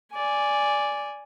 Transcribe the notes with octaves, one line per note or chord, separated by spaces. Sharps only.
D5 G#5